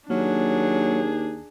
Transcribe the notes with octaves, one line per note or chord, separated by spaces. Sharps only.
D#2 F#3 A#3 D4 G#4